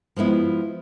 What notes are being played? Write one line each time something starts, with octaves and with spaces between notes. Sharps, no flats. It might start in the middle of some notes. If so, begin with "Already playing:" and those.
F3 G#3 B3 E4